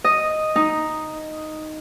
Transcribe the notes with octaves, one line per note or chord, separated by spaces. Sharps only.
D#5
D#4